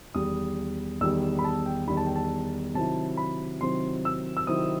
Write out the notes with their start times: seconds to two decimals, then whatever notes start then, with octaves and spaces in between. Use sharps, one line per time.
0.14 E2 D#3 G3 D#6
1.01 E2 D#3 G3 E6
1.39 B5
1.44 A5
1.66 G5
1.87 E2 D#3 G3 B5
1.97 A5
2.07 G5
2.16 A5
2.74 C3 D#3 F#3 C4 E4 A5
3.17 B5
3.61 C3 D#3 F#3 C4 E4 C6
4.05 E6
4.37 E6
4.47 C3 D#3 F#3 C4 E4 D#6